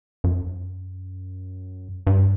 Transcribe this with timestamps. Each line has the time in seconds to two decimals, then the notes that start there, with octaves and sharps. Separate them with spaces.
0.24 F#2
2.07 G2